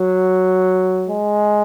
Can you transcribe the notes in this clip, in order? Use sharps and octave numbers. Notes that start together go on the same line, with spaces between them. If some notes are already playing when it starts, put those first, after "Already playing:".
Already playing: F#3
G#3